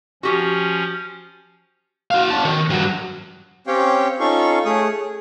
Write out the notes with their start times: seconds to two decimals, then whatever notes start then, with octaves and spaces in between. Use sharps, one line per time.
0.23 F3 C#4 F#4 G4
2.11 F#4 F5
2.30 C#4 A5
2.45 D#3
2.70 G2 F#3
3.67 C4 C#4 G4 C#5 F5 G5
4.20 C#4 D#4 F4 A4 F5 C#6
4.65 A3 G#4 C#5 D#6
5.00 G#4